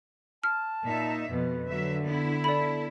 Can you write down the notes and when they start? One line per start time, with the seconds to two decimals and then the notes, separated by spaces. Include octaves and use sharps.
0.44 A5 F6
0.84 A#2 D#4 E5
1.31 F2 B2 B4
1.67 D3 F#3 E5
2.04 B3 E4
2.44 A4 D5 B5